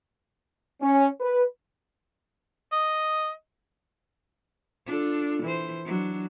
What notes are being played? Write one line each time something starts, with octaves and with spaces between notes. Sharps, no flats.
C#4
B4
D#5
D4 F4 A4
E3 C5
F#3 D4